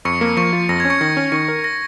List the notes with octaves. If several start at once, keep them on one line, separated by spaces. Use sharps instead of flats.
F2 C#6 C#7
A#3
F3 C#6 C#7
F4
F2 A#6
C#4 G#6
C#6 C#7
D#3 A#6
C#4
D#3 C#6 C#7
A#4
A#6